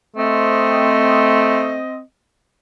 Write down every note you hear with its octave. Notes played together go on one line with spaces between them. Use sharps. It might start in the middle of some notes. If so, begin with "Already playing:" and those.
A3 C4 D#5